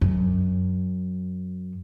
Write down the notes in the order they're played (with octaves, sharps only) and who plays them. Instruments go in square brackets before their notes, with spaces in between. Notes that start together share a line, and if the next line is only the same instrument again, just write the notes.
[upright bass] F#2